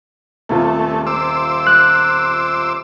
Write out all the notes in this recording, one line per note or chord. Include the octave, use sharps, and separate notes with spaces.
D#1 C3 A3 F4
C5 D6 E6
F#6